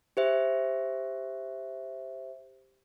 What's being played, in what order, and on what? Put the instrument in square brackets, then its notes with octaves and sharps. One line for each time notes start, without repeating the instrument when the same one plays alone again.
[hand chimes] G4 C5 E5